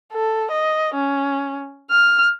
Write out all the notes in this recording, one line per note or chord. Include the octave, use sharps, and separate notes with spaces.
A4
D#5
C#4
F6